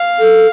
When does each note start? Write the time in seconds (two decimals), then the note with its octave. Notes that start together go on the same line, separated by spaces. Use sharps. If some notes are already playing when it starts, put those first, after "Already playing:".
Already playing: F5
0.20 A4